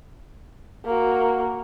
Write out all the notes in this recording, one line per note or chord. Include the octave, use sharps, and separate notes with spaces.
A#3 F#4